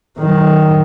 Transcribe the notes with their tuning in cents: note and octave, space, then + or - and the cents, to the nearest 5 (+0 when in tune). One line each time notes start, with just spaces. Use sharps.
D#3 +0 F#3 +35